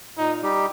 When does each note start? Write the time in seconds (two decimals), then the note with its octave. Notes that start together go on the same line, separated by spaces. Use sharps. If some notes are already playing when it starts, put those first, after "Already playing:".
0.18 A#2 D#4
0.42 G3 D#4 G4